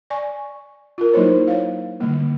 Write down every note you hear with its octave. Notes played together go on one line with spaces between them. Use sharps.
D5 G#5 C#6
F4 A#4
F#3 A#3 D#4 E4 C5 C#5
C#5 F5
D3 G3 A#3